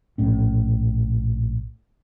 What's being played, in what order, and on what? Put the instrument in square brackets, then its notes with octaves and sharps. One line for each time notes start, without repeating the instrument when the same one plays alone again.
[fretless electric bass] A#1 A2 C#4